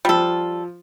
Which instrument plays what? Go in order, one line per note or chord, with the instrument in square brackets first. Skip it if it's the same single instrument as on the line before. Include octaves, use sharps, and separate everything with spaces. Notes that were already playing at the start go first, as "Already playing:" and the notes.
[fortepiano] F3 F4 [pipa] G3 A4